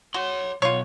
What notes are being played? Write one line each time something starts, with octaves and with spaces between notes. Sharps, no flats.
F#4 C#5 C6
B1 F4 C#5